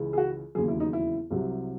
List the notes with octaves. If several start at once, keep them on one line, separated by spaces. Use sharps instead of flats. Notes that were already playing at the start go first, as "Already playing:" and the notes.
Already playing: C#2 C#3 E3
G#4
F#4
E1 D#2 C#3 F#3 G#4
E4
D#4
E4
C2 C3 F#3